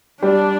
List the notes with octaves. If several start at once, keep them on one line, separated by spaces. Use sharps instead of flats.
G3 D4